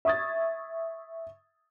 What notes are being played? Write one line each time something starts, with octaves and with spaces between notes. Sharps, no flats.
E5 C#6 D#6 G#6 A6